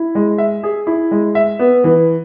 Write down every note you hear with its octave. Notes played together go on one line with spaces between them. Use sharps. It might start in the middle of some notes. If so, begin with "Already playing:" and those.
Already playing: E4
G#3
E5
G#4
E4
G#3
E5
B3
E3